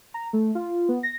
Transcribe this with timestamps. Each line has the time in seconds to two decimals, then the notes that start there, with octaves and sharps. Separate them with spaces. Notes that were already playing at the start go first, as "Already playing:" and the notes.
0.14 A#5
0.33 A3
0.55 F4
0.89 B3
1.03 A#6